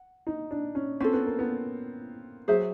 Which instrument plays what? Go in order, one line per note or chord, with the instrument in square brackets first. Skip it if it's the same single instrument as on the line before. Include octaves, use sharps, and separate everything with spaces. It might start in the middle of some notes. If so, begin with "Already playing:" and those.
Already playing: [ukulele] F#5
[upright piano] D#4
D4
C#4
[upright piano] C4 [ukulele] C#4 F4 A4
[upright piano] B3
A#3
B3
[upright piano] F#3 [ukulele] G#4 C5 E5